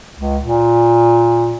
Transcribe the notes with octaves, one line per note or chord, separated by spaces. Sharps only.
C#2
A#2